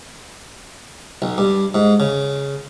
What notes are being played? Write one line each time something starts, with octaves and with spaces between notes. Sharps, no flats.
B1
G2
G#2
C#3